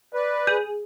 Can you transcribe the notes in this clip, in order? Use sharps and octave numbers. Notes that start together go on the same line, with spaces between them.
B4 D5
G#4 G6